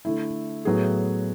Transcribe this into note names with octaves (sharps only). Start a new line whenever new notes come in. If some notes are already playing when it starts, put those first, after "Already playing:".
D3 A3 E4
A2 F#3 B3 E4 G#4